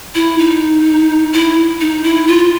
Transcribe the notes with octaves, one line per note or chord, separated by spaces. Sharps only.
E4
D#4
E4
D#4
E4
F4